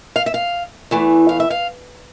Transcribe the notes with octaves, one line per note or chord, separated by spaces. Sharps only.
F5
E5
F5
E2 E3 A3
F5
E5
F5